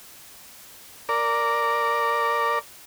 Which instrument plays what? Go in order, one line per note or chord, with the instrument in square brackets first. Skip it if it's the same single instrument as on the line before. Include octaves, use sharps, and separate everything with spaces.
[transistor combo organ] A#4 D5